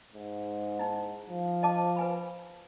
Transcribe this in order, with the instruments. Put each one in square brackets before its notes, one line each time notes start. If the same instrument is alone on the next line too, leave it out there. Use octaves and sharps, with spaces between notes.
[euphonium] G#2
[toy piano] D#4 E4
[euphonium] F3
[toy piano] D#5 A5 D6
B4 G#5 B5